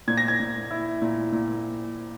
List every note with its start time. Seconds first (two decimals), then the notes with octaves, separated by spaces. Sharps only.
0.08 A#2 G#6
0.17 A#6
0.28 G#6
0.40 A#2
0.71 E4
1.02 A#2
1.32 A#2